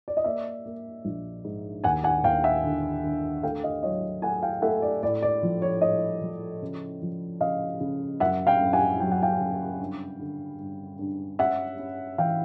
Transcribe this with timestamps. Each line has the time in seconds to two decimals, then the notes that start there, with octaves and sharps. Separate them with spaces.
0.08 D5
0.17 D#5
0.24 A#3 D5 E5
0.65 A#3
1.05 A#1
1.44 G#2
1.84 D#2 F#5 G#5
2.04 F#5 G#5
2.24 D#2 F5 G5
2.44 E5 F#5
2.64 D3
3.04 D3
3.43 A3 F5 G5
3.63 D#5 F5
3.83 F#3 C#5 D#5
4.22 A3 F#5 G#5
4.42 F5 G5
4.62 A3 E5 F#5
4.82 D5
5.03 A2 D5
5.22 D5
5.42 F3
5.62 C#5
5.81 A2 C#5 D#5
6.21 F3
6.62 C#3
7.02 F3
7.41 C#3 D#5 F5
7.80 C#3
8.20 F#2 E5 F#5
8.47 F5 G5
8.61 F#2
8.73 F#5 G#5
9.00 F#3 G5
9.12 F#5
9.23 F5 G5
9.40 C#3
9.79 G2
10.19 D3
10.59 G2
10.99 G2
11.39 C#4 E5 F#5
11.79 C#4
12.18 E3 F5 G5